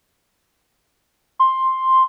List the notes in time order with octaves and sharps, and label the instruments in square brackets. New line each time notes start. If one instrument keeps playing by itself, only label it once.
[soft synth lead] C6